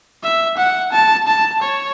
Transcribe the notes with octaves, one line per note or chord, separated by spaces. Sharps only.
E5
F#5
A5
A5
C#5